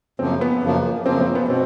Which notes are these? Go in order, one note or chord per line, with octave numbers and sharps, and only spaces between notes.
F#2 C#3 F3 A#3 C4
B3
F#2 C#3 F3 A#3
F#2 C#3 F3 A#3 C4
C4
B3
B2 C4